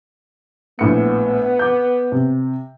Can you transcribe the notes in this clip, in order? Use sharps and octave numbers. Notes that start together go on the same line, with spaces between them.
A#1 A2 B3 C#7
D6 G6
C3